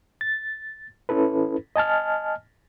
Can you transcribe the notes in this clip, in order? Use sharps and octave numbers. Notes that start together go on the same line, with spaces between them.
A6
C#4 E4 A4 B4
D#5 G#5 A5 F6